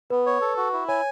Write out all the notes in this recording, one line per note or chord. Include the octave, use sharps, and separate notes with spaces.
B3 B4
C#5
A4
F#4
E4
C#5 G#5